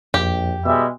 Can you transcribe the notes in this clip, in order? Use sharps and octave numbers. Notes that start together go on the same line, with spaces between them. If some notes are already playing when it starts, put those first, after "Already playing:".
A#1 F2 G4
B2 G3 G#3 E5